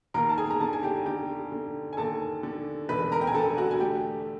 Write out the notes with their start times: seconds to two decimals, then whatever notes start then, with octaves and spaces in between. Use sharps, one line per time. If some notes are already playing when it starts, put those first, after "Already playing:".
0.14 D#2 A#4 A#5
0.29 A5
0.38 G#4 G#5
0.51 A#5
0.60 D3 A5
0.73 G#5
0.83 G4 G5
1.06 D3 G4 G5
1.52 D3
1.93 G#5
1.97 D#2 A4 A5
2.43 D3
2.89 E1 B4 B5
3.12 A#4 A#5
3.21 G5
3.27 G#5
3.34 D3 A4 A5
3.57 F#4 F#5
3.71 G#5
3.80 A3 G4 G5